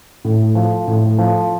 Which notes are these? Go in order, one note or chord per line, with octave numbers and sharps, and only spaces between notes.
A2
F3
A2
F3